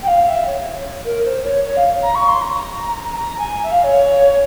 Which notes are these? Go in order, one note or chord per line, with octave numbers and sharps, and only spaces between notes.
G5
F5
E5
C#5
C#5
A#4
C5
C#5
C#5
F5
A#5
C#6
C6
A#5
A#5
G#5
E5
F5
C#5